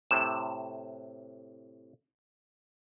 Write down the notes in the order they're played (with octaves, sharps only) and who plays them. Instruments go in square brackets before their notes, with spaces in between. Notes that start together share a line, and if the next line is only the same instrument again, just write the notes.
[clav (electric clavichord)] A2 C3 [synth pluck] E7